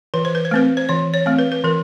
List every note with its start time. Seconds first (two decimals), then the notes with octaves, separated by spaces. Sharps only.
0.14 E3 B4
0.25 C5
0.35 B4
0.45 C5
0.51 A3 C4 B4
0.77 C5
0.89 E3 C#5
1.14 C#5
1.26 A3 C4
1.39 B4
1.52 B4
1.64 E3 A#4